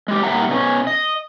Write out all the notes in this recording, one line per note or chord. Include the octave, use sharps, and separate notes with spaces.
G#3 G4
A#2 G3 E5 F#5 A#5
B2 C#4
D#5